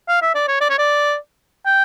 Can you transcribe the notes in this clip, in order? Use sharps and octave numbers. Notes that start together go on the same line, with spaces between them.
F5
E5
D5
C#5
D5
C#5
D5
G5